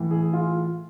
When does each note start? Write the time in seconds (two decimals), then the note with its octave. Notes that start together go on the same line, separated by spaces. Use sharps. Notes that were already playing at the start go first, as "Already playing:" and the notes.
Already playing: A2 E3
0.10 G#4
0.33 F4